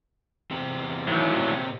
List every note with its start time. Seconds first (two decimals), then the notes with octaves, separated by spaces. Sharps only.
0.51 E2 C4 G4
1.08 A2 D#3 E3 F#3
1.34 A#2 C4 G4